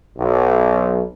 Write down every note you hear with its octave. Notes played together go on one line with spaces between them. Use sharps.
B1